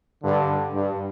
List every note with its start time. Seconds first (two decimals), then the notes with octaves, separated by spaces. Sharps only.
0.23 G2 D3
0.73 G2